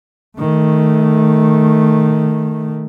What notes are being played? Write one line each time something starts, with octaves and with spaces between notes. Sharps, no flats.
D#3 A3